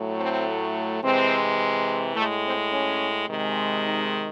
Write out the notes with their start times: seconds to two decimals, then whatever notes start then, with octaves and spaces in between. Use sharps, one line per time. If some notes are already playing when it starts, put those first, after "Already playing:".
Already playing: A2 F#3 A3
0.17 C4
1.01 C3 E3 G#3 C4
2.15 A2 A3
2.19 G#3
2.44 C4
2.72 C#4
3.27 C3 D#3 G#3
3.85 D#4